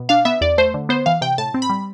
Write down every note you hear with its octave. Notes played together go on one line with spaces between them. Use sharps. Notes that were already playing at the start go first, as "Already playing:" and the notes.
Already playing: B2
D4 F5
B3 E5
E2 D5
A3 C5
D3
B3 C5
E3 F5
C3 G5
A2 A5
C4
B5
G3